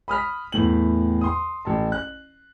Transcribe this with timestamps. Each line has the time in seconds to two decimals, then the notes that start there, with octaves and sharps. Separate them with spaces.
0.08 B5 D#6 F6 B6
0.52 E2 A2 F#7
1.21 C6 D#6
1.65 A1 A5
1.92 F#6